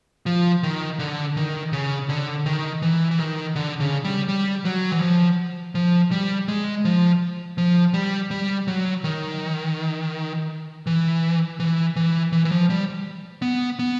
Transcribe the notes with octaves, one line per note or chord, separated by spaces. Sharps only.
F3
D#3
D3
D#3
C#3
D3
D#3
E3
E3
D#3
D3
C#3
G3
G3
F#3
E3
F3
F3
G3
G#3
F3
F3
G3
G3
F#3
D#3
E3
E3
E3
E3
E3
F3
G3
B3
B3